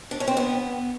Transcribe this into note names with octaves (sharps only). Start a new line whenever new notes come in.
D4
C#4
C4
B3